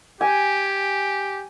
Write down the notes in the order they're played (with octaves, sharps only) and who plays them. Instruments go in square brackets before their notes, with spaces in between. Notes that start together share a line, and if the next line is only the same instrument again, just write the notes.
[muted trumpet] G4 [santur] G#5